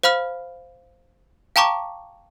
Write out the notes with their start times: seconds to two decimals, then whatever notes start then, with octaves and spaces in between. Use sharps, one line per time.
0.03 C5 F5 B5 F6
1.56 F5 G5 A5 A#5 C#6 D6